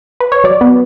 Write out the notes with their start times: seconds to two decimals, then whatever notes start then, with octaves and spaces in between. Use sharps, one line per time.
0.20 B4
0.32 C#5
0.44 F#3 D5
0.61 B3